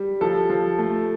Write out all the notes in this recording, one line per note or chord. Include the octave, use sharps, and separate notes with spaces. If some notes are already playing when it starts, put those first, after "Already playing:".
Already playing: G3
F3 A4
F3
A3